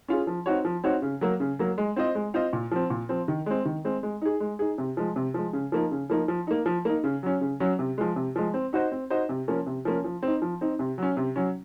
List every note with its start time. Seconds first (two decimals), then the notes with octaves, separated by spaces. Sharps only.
0.08 C#4 F4 G#4
0.27 F3
0.46 C4 D#4 F#4 C#5
0.65 F3
0.84 C4 D#4 F#4 C#5
1.02 C#3
1.21 F#3 A#3
1.40 C#3
1.59 F#3 A#3
1.78 G#3
1.96 C4 F4 C5 D#5
2.15 G#3
2.34 C4 F4 C5 D#5
2.53 A#2
2.71 F3 C4
2.90 A#2
3.09 F3 C4
3.28 D#3
3.46 G#3 C4
3.65 D#3
3.85 G#3 C4
4.03 G#3
4.22 D#4 G#4
4.40 G#3
4.59 D#4 G#4
4.78 C3
4.97 F3 G#3
5.16 C3
5.34 F3 G#3
5.53 C#3
5.72 F3 A#3 D#4
5.91 C#3
6.10 F3 A#3 D#4
6.28 F3
6.47 A#3 D#4
6.66 F3
6.85 A#3 D#4
7.04 C#3
7.23 F#3 C#4
7.41 C#3
7.60 F#3 C#4
7.79 C3
7.98 F3 G#3
8.16 C3
8.36 F3 G#3
8.54 C4
8.73 D#4 F#4 C5 D#5
8.92 C4
9.10 D#4 F#4 C5 D#5
9.29 C3
9.48 F3 A#3 C#4
9.66 C3
9.85 F3 A#3 C#4
10.04 F3
10.23 C4 D#4
10.42 F3
10.61 C4 D#4
10.79 C3
10.98 F#3 C#4
11.17 C3
11.36 F#3 C#4